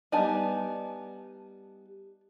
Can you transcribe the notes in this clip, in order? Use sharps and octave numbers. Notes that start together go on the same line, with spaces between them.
G3 B3 D#4 D5 G#5 A5